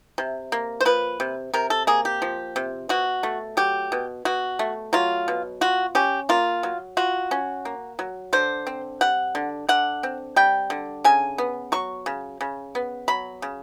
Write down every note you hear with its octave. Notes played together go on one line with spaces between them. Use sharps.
C3
A#3
C5
F3 B4
C3
C3 A#4
A4
A#3 G#4
G4
F3
C3
B2 F#4
A3
F#3 G4
B2
B2 F#4
A3
F#3 F4
B2
F4 F#4
C#4 G4
A#3 F4
F#3
F4 F#4
C#4
A#3
F#3
D3 C5
C4
G3 F#5
D3
D3 F#5
C4
G3 G5
D3
C#3 G#5
B3
F#3 C#6
C#3
C#3
B3
F#3 B5
C#3